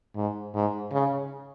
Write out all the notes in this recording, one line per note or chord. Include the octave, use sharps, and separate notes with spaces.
G#2
G#2
C#3